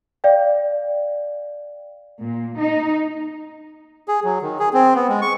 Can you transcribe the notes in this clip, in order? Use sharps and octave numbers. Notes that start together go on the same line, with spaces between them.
D5 F5 G5
A#2
D#4
G#4
F#3
D#3
G#4
C4
B3
G#3
C#6